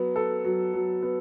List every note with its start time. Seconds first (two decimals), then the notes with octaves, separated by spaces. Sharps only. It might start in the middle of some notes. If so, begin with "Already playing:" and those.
Already playing: F#3 B3
0.16 A4
0.45 F#3
0.73 F#3
1.03 B3